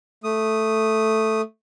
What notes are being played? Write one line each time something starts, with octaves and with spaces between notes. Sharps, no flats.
A3 D#6